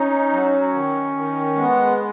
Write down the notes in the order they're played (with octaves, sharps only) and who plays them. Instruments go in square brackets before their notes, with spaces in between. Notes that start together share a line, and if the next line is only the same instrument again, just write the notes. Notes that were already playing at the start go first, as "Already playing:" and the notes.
Already playing: [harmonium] C#4 [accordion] D#4
[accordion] F#3
D#3
D#3
[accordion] G#3 [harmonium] B3